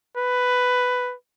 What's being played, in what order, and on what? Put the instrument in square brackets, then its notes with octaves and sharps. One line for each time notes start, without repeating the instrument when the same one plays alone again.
[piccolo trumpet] B4